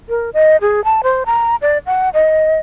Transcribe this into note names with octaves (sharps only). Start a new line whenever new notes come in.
A#4
D#5
G#4
A5
C5
A#5
D5
F#5
D#5